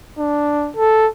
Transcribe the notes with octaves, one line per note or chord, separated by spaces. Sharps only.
D4
A4